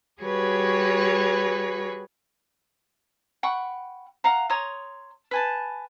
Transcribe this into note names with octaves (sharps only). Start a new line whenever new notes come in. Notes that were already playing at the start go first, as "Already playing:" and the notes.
G3 F#4 G#4 B4 C#5
F#5 G5 B5 C#6
F5 F#5 A#5
C#5 A#5 C6 D#6
B4 G#5 A5